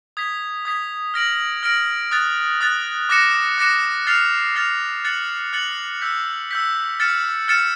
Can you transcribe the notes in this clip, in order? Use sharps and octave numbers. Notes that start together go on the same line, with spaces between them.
D#6 G#6 B6
D#6 G#6 B6
F6 A#6 D7 F#7
F6 A#6 D7 F#7
D#6 F#6 A6
D#6 F#6 A6
D6 F#6 A#6 C#7 E7
D6 F#6 A#6 C#7 E7
F6 A6 C7 F7
F6 A6 C7 F7
F#6 A6 C#7 F#7
F#6 A6 C#7 F#7
E6 G6 B6
E6 G6 B6
F6 A6 C#7 E7
F6 A6 C#7 E7